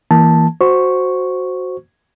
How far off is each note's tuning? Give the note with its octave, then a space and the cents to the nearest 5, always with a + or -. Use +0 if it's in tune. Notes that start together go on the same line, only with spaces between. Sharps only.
E3 -10 A#3 +0 A5 +0
F#4 +0 C5 +0 C#6 +0